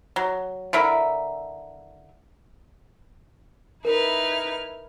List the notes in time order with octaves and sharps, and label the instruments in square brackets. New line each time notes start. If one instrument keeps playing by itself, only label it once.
[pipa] F#3
D3 E4 A#4 E5
[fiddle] D#4 B4 [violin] E4 F6 [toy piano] A#4